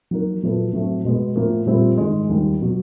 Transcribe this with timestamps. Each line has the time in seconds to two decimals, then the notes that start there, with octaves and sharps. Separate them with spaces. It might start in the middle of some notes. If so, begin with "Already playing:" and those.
0.11 F#3 A#3 D#4 F#4 A#4
0.43 A#2 F#3 B3 E4 A4
0.73 A2 F#3 A3 C4
1.05 B2 G#3 B3
1.36 A2 F3 A#3
1.66 A#2 G3 C4 E4 G4
1.97 G#2 D#3 G#3
2.29 D#2 D#3 G3
2.61 B2 F#3